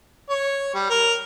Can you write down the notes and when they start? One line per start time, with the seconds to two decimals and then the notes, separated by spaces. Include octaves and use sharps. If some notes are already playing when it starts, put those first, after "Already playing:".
0.30 C#5
0.74 G3
0.90 A#4